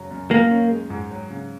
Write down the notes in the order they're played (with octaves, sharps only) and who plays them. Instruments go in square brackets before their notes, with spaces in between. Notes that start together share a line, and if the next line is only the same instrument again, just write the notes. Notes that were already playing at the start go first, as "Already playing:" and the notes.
Already playing: [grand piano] F#2 C#3 F#3
F#2
[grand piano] D#3 [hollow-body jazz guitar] A#3
[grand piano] C#4
G#3
G#2
F#3
C#3